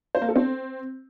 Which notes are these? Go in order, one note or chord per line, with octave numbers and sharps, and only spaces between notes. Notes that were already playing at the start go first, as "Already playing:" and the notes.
C5
A#3
A4
C4